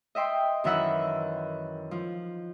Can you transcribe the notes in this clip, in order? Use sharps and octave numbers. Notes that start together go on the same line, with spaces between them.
D#5 E5 G5 C6
F#2 D#3 E3 E5 F#5 E6
F3